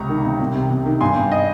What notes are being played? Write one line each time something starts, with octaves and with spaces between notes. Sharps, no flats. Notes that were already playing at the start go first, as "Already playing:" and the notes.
Already playing: C#2 C3 A#5 C#6
D#3
C3
C2
C3
C3
D#3
G2 G#5 C6
G2
D#5